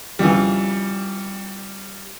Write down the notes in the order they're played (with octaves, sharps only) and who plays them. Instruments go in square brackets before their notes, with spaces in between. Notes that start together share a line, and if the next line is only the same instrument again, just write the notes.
[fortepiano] F2 C#3 E3 [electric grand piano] G3